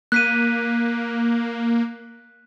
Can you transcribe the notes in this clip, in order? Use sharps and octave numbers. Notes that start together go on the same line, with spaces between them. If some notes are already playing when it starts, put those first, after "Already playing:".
A#3 F#6 B6 D#7